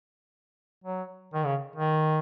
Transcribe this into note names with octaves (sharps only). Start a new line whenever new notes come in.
F#3
D#3
C#3
D#3